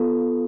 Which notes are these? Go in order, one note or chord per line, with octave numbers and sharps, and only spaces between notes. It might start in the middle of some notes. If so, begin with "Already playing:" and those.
Already playing: B3 F4 A4